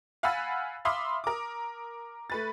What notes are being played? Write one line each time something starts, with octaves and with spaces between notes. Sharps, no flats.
F5 F#5 G#5 B5 E6 A6
E5 F5 B5 C6 D6 D#6
A#4 D6
A3 B4 A6